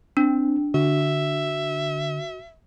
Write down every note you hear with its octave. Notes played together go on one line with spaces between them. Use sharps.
C4 D4
D3 F#4 E5